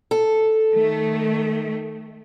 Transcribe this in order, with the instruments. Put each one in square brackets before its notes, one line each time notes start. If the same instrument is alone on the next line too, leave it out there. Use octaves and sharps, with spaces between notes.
[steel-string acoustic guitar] A4
[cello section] D#3 A3